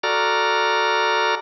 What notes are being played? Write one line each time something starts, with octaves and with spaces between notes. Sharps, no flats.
F#4 A4 D5 A#5 F6